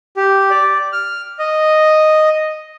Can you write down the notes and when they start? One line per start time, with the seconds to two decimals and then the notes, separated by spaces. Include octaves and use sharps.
0.17 G4
0.50 D5
0.93 F6
1.39 D#5